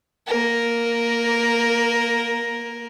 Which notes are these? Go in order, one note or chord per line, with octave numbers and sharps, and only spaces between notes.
A#3 A#4